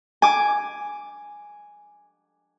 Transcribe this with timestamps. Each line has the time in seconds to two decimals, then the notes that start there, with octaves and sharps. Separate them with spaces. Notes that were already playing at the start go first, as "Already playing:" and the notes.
0.22 G#5 D6